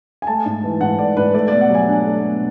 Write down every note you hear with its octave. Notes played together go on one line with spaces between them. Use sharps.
G#5
A3 A5
G#2
E3
G#2 F#5
A3 D5
G#2 B4
A3 D5
B2 D5
F#5
F#3 G#5
D4
A3
B2